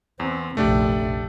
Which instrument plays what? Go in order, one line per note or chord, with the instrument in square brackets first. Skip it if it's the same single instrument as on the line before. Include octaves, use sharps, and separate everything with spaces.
[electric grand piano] E2 [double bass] C4
[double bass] F1 A#1 [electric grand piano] A3 D4 G4